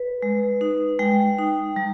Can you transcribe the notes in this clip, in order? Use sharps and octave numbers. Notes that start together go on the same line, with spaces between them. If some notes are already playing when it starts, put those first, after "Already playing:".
Already playing: B4
G#3
D#4
G#3 G5
D#4
G3